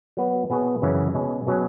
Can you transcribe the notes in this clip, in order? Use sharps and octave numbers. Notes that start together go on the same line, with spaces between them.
F#3 B3 F#4 B4
B2 B3 E4 G#4 C#5
F#2 C#3 E3 C#4 E4
B2 G#3 C#4
B2 F#3 C#4 G#4